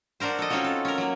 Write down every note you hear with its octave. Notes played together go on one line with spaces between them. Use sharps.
D4 F#4 A#4 C5
A4 D#5
C4 C#4 D#4 F4 F#4
A4
C#4 A#4
F#3 A#3